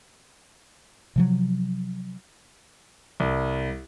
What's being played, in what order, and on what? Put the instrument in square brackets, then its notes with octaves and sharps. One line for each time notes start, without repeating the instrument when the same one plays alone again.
[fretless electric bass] C3 F3 F#3
[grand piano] C2